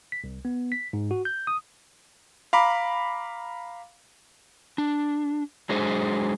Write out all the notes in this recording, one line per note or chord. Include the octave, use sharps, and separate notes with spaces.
B6
C2
B3
B6
G#2
F#4
G6
D#6
F5 A#5 B5 D6
D4
F#3 G#3 D4 G#4 C5